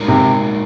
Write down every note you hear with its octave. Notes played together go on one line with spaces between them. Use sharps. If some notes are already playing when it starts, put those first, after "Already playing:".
Already playing: A#2 G#3 D#4 A#4
C3